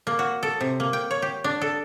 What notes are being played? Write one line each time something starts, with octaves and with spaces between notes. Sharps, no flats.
A#3
F#4
A4
C3
A#3
G5
C#5
G4
D4
A4